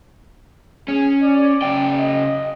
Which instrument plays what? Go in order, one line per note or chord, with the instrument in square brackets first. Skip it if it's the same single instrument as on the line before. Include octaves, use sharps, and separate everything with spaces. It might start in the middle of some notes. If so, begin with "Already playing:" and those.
[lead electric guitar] C#4 [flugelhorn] G#4
[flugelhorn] D5
[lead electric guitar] C#3 G5
[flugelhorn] D#5